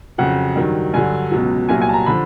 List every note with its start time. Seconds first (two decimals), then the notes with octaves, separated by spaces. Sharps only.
0.18 F2 C#3 F#3 F#5
0.56 G2 D#3 F#3
0.94 G2 D3 F#3 G#5
1.32 C#2 B2 F#3
1.69 C2 A#2 F#3 G#5
1.81 G#5
1.89 A5
1.94 A#5
2.06 D3 F3 B5